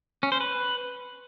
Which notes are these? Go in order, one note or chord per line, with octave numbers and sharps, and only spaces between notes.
C#4
C5
B4